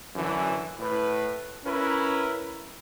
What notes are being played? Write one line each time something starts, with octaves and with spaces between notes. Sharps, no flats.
F#2 D3 E3
A2 B4
C#4 E4 A#4 B4